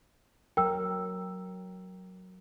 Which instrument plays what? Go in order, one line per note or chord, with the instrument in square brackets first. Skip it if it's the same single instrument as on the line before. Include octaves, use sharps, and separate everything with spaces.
[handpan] F#3 A#4 [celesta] G5 E6